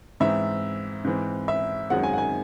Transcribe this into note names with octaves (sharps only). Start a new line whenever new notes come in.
G#2 E3 C4 E5
G#2 E3 C4
E5
F#2 D#3 G#3 C4 F#5
G#5
F#5
G#5